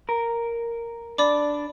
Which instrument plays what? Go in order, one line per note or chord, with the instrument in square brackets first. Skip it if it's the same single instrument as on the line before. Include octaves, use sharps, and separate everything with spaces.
[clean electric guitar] A#4
[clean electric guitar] D4 [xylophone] D5 B5 D6